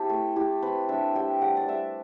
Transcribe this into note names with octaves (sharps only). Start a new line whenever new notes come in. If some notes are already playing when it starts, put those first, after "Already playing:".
Already playing: C4 E4 G4 A4
A3
E4 G4
C4 B4
D4 E5
G3 G5
G3 F#5
D5
G3 E5